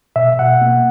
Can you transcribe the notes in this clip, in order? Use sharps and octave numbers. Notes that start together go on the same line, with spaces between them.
B2 E5
B2 F#5
A#3